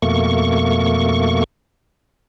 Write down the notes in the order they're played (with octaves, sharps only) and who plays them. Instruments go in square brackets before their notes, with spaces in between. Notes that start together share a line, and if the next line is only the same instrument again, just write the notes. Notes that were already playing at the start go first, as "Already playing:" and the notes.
[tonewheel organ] F2 B2 A3 A#3 C#6